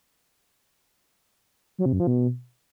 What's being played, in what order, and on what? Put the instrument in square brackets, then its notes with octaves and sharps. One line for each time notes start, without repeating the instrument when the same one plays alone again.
[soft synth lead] F#3
C3
F#2
F3
B2